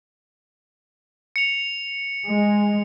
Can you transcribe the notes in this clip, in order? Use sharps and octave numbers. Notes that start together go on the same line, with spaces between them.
C#7 F7
G#3